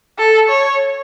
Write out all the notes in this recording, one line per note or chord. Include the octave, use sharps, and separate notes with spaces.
A4
C#5